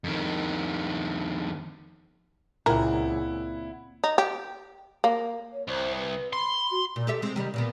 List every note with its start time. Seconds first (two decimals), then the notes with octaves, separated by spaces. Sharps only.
0.04 F2 D#3
2.66 C#2 A#2 C4 E4 A#4 F#5
4.04 D#4
4.18 G4
5.04 A#3
5.52 C#5
5.67 C2 C5
5.97 B4
6.33 B5 C6
6.71 F#4
6.96 A#2
7.07 G4 A4 E5
7.22 G#3 C4
7.36 C3 D#3 G3
7.54 A#2 A#3 B3